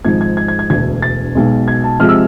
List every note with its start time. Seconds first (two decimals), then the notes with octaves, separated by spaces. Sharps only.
0.05 G#1 G#2 F3 G#3 G#6
0.21 G#6
0.37 G#6
0.48 G#6
0.59 G#6
0.70 E1 D2 D3 G#6
1.02 A6
1.35 B1 B2 G#3
1.68 G#6
1.84 A5
2.00 C3 F3 G#3 F6
2.09 E6